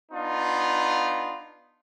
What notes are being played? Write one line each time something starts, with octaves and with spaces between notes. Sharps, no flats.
B3 D4 D#4 F4